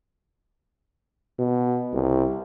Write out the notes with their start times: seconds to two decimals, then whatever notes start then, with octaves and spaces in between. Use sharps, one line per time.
1.39 B2
1.93 C2